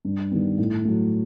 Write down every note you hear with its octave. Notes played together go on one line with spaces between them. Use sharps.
G2
D#3 G3 B3
A2
F#3 A3